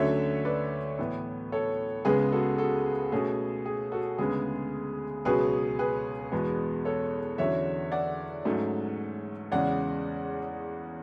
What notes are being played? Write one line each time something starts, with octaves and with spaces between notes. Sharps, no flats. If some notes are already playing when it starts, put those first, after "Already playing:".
Already playing: D2 D3 F#3 A3 C#4 C#5 E5
B4 D5
A2 E3 B3
A4 C#5
C#2 C#3 G#3 B3 G#4 B4
F#4 A4
F#4 A4
B2 A3 C#4 G#4
G#4
F#4 A4
D2 C#3 G#3 B3 G#4
C#2 B2 F#3 C#4 G#4 B4
G#4 B4
E2 B2 G#3 B3
A4 C#5
E2 D3 F#3 C#4 C#5 E5
D5 F#5
G#2 F#3 A3 C#4
E2 C#3 G#3 C#4 D5 F#5